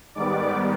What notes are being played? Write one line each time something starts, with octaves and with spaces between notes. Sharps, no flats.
G#2 D#3 G3 B3 D5 D6